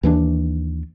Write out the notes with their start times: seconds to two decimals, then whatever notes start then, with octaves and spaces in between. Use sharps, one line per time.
0.03 D#2 E3 G#3 D4